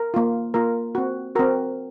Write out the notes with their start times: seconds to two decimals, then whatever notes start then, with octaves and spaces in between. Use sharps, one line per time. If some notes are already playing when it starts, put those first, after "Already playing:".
Already playing: A#4
0.14 A#3 F4
0.54 A#3 F4 A#4
0.95 C4 F#4
1.35 C4 F#4 A#4